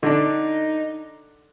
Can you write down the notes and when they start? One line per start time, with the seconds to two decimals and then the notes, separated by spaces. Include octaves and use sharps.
0.03 D3 D4 D#4